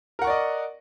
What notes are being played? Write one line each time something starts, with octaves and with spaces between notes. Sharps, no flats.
A#4 D5 D#5 F#5 C#6